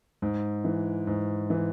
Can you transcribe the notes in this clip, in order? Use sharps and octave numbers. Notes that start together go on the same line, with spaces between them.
G#2
E3
G#2
E3